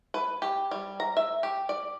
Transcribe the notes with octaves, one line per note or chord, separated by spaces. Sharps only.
B4
G4
G3
A#5
E5
G4
D5